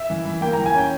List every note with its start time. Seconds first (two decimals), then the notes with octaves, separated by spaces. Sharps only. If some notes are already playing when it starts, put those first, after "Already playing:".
Already playing: E5
0.10 E3
0.25 E3
0.41 A#3 G5
0.53 E3 A#5
0.66 G#5
0.74 C#4 G5